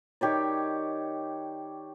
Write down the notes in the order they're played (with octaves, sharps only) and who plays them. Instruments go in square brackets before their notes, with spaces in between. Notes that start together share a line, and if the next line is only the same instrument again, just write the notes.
[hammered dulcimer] D#3 G4 C#5 D5